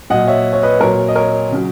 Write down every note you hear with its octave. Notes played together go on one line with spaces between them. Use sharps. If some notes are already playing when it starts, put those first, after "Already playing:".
A#2 F#3 D#5 F#5
C#5 E5
C#5
B4 D#5
A#2 F#3 A#4 C#5
D#5
A#4 C#5
C#3 F#3